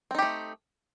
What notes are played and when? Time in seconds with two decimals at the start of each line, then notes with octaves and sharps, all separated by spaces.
0.11 C4
0.15 D#4
0.19 G4
0.22 A3